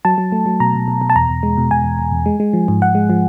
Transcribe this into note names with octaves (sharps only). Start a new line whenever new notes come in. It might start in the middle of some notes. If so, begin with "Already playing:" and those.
F#3 A5
F#3
A3
F#3
B2 A#5
B2
B2
B2
A5
E2 A#5
E2
G#3
B2
B2 G#5
E2
E2
E2
G#3
G#3
F3
G#2
G#2 F#5
G#3
F3